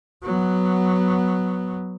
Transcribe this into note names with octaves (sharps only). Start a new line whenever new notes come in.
F#3 B3